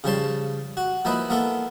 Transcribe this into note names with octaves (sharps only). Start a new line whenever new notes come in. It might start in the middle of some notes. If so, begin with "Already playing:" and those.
C#3 F3 G3 C#5 A5 C6
F#4
F3 A#3 D#4 E4 B4
A#3 B3 E4 F4 A4